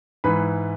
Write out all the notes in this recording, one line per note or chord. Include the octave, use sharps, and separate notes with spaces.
G#2 E3 B4 B5